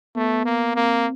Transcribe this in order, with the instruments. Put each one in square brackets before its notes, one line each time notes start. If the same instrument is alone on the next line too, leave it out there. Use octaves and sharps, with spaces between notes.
[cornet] A3 [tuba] B3
[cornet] A#3
[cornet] A#3 [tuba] C4